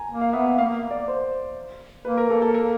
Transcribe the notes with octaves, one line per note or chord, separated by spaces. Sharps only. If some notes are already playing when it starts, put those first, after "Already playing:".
Already playing: G#5 A#5
A#3
F5
B3 E5
E5
A#3 F5
D5
C5
A#3 B4
A#4
A#3 A4
A4
A#4